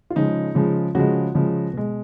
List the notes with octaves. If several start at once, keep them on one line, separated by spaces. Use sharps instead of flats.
F4
C#3 F3 G#3 D#4
C#3 F3 G#3
C#3 F3 G#3 F#4
C#3 F3 G#3
B2 G#3